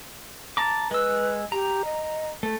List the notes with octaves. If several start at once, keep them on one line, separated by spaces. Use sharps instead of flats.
A5 A#5 D6
G#3 B4 E6
G4 A#5
D#5
A3